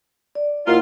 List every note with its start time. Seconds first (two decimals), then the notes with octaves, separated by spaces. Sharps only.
0.35 D5
0.67 D#2 A#2 D#3 A#3 E4 F4 F#5